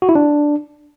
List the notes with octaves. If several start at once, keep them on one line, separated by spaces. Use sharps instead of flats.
F#4
E4
D4